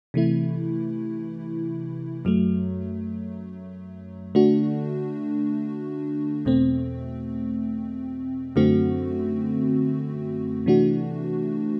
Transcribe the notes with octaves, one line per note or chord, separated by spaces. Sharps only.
C3 E3 A3 E4
F#2 F#3 A3
D3 A3 D4 F#4
E2 B2 A3 C4
F#2 D3 A3 C4 F#4
C3 E3 A3 D4 F#4